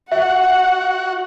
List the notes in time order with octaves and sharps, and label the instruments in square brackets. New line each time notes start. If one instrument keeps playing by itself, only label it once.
[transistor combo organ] F#4 [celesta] E5 [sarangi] F#5